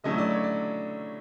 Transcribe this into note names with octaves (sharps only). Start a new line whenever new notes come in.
D3 F#3 A3 C#4 E4 D#5
D5
C#5
D5